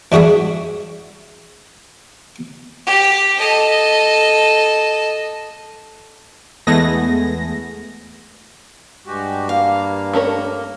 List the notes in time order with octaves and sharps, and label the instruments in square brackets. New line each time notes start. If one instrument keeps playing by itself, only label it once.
[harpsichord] E3 D4 F#4 G#4 E5
[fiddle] G4
A4 D#5
[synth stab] E2 G#3 A3 B3 G#4 A#6
[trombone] G2 [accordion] G#3 F#4 G4
[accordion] A#3 [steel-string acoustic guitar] F5
[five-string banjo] A3 C#4 A#4